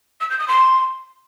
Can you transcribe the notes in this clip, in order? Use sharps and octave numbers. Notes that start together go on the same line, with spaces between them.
E6
G6
D#6
C6